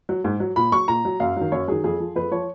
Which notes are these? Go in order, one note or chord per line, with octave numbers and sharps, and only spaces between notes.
F#3
G#2
F#3
A#2 B5
F#3 C#6
A#2 A#5
F#3
F#2 F5
D#3 F#3
F#2 C#5
D#3 F#3 G#4
F2 G#4
F3
F2 B4
F3 C#5